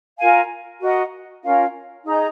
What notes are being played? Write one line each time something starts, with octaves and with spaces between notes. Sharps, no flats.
F4 A#4 F5 G#5
F#4 A#4 D#5 F#5
C#4 F4 A#4 F5
D#4 G#4 D#5 A#5